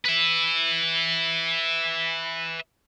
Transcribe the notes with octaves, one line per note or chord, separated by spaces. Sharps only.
B4 E5